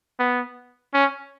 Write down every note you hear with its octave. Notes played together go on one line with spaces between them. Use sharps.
B3
C#4